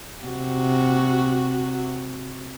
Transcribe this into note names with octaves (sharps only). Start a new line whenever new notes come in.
C3 F#4